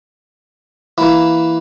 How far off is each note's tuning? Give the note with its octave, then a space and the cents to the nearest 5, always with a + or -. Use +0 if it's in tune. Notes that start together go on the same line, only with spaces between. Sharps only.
E3 +0 A#3 +0 E4 +0